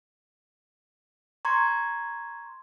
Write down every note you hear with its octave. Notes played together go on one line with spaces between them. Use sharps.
A#5 C6 C#6 G#6